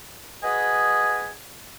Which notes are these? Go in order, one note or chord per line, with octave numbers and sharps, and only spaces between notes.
F#4 G#4 B4 D#5 G#5